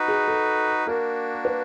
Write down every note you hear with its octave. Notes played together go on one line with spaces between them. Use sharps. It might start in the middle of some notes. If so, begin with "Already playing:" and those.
Already playing: D#4 F#4 B4
G#4
A4
A#3 D4 F#4 A#4
B4